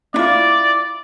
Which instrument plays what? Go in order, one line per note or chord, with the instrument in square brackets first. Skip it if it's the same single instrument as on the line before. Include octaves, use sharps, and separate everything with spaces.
[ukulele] D4 E4 F4 [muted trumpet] D5